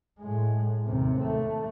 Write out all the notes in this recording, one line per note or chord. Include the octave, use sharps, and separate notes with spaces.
A2 G#3
D#2 C3
A3